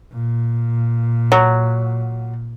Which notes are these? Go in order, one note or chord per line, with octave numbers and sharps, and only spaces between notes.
A#2
F#3